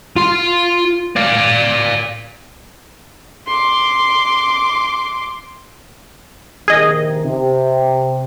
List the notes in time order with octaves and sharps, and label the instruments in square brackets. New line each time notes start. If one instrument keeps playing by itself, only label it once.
[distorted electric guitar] F4 C6
D5 F5
[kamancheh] C6 D6
[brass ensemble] A#1 C3 D#3 [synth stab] G#4 D#5
[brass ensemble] C3